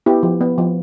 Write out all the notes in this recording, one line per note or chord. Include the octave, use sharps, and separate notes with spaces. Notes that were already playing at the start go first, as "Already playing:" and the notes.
B3 E4 G4
F3
B3
F3